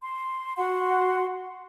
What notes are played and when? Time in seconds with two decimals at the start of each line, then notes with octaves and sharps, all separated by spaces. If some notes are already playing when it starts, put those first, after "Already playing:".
0.01 C6
0.57 F#4 F#5 C6